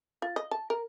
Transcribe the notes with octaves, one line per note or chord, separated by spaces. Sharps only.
F4
D#5
A5
A#4